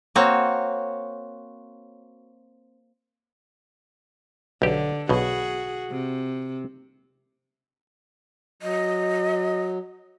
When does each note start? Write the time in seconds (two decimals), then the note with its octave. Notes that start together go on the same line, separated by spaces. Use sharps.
0.15 A#3 C4 F#4 C#5
4.62 B1 D3 G4
5.09 B1 B2 F#4 G#4
5.90 C3
8.62 F#3 D#5